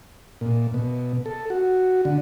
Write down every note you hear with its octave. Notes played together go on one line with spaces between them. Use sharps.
A#2
B2
A4
F#4
D3